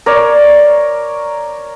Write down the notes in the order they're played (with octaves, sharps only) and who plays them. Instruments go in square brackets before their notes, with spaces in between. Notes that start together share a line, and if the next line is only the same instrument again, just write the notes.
[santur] A#4 C#5 D5